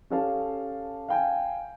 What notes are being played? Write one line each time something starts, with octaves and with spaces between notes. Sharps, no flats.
C#4 G4 A4 F5 A5
F5 G5 G#5